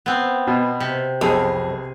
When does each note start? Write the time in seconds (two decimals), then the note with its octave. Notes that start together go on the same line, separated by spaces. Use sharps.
0.06 B3 C4
0.47 B2
0.80 C3
1.21 B1 F2 G#4